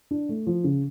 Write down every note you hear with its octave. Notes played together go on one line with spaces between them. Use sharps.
D4
A3
F3
C#3